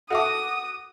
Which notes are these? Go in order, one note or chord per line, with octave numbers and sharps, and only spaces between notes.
F#4 A4 E5 A5 D6 D#6